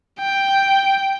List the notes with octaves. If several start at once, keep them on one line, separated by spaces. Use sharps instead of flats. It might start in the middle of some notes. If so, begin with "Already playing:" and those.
G5